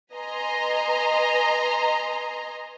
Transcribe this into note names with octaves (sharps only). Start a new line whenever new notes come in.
B4 D#5 G#5 A#5 C6